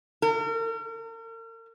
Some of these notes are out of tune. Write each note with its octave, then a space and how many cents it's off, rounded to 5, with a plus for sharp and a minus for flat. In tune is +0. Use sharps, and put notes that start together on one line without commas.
A#4 -40